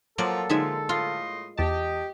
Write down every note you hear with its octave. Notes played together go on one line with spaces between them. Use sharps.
F3 F#3 A#3 A4 D5
A#2 D3 F3 G#3 D#4 G#4 E5
A2 F4 D#5 C6
E2 G4 D#5 A5